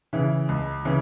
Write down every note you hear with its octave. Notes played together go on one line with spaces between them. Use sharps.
C#3 E3
C#2
C#3 E3